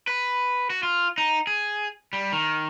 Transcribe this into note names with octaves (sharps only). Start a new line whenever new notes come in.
B4
F#4
F4
D#4
G#4
G3
D#3